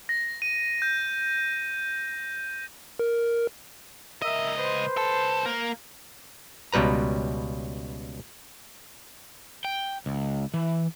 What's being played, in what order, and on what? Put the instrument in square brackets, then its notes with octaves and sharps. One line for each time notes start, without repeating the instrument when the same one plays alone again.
[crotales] A#6
D#7
G6
[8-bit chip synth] A#4
[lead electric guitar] C#2 D#5 [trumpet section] A#4 E5
[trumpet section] B4 C5
[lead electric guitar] C2 A4
A#3
[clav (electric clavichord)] C#2 B2 G3 B4 A#5
[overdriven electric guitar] G5
C#2
E3